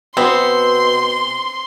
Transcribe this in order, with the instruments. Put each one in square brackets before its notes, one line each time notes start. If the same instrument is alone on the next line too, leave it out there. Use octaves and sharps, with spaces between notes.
[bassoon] B2 [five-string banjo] B3 F#4 [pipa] C4 [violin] C6